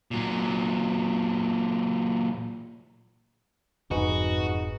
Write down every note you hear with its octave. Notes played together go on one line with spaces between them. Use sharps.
A#2 F#3
F#1 F2 G#2 D#4 F#4 G#4 B4